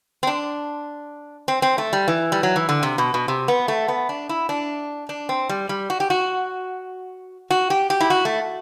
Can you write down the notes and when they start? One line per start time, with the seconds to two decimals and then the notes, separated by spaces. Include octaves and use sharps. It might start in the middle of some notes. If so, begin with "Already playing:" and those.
0.23 C4
0.27 D4
1.48 C4
1.62 C4
1.78 A3
1.93 G3
2.08 E3
2.32 G3
2.43 F#3
2.56 E3
2.69 D3
2.83 C3
2.98 B2
3.14 B2
3.28 C3
3.48 B3
3.68 A3
3.88 B3
4.09 D4
4.29 E4
4.49 D4
5.09 D4
5.29 C4
5.49 G3
5.69 G3
5.90 F#4
6.00 G4
6.10 F#4
7.50 F#4
7.70 G4
7.90 G4
8.01 E4
8.10 F#4
8.25 A3